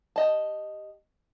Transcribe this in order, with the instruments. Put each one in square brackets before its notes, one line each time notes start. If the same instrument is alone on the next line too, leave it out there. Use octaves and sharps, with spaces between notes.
[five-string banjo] G4 D#5 A5